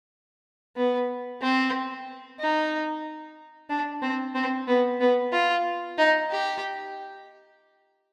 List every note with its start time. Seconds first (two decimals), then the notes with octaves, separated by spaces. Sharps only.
0.76 B3
1.42 C4
2.39 D#4
3.69 D4
4.02 C4
4.35 C4
4.67 B3
5.00 B3
5.33 F4
5.98 D#4
6.31 G4